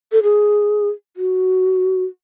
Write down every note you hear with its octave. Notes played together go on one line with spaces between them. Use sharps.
A4
G#4
F#4